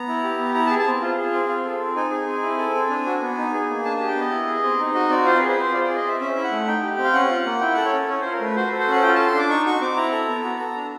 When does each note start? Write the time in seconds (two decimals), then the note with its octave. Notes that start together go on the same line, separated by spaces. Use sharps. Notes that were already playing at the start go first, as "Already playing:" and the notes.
Already playing: B3 A#5
0.08 E4
0.24 G4
0.39 B3
0.54 E4 A#5
0.66 A5
0.70 G#4
0.78 A5
0.87 C4
1.01 F4
1.17 G#4
1.34 C4
1.49 F4
1.65 A4
1.80 C4
1.96 D#4 G#5
2.11 G#4
2.27 C4
2.43 E4
2.58 A4
2.75 C4
2.90 D4
3.06 F#4
3.21 B3
3.38 D#4
3.53 G#4
3.69 A#3
3.85 D4 A5
3.97 G4 A5
4.07 G5
4.16 B3 D#5
4.31 E4
4.47 G#4
4.64 C4
4.79 D#4
4.94 F#4 D#5
5.10 C4 D5
5.25 F4 C5
5.38 B4
5.42 G#4
5.49 B4
5.57 C4 C5
5.73 F4 D5
5.84 G#4 D5
5.96 D#5
6.05 C4 E5
6.20 C#4 E5
6.36 E4
6.44 F#5
6.51 A3
6.67 D#4 G5
6.83 G4
6.98 C4
7.04 F5
7.14 C#4 F#5
7.30 F4
7.45 A#3
7.61 E4 G5
7.74 A4 F#5
7.85 C#5
7.92 C#4
8.09 C#4 C#5
8.21 F4 C5
8.32 A#4
8.40 A3 B4
8.56 F#4 C5
8.67 A4 B4
8.79 C5
8.88 C#4 F#5
9.02 F4 G5
9.15 A4 A5
9.26 C6
9.34 D4 D6
9.50 D#4 C#6
9.66 F#4 C#6
9.81 C4 D6
9.96 E4 A#5
10.12 A4
10.28 B3
10.45 F#4
10.60 A4
10.76 D4